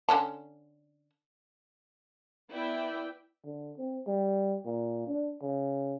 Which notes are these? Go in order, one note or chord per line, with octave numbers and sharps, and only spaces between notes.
D3 C#4 A5
B3 E4 B4 D5 E5 G5
D3
C4
G3
A#2
D4
C#3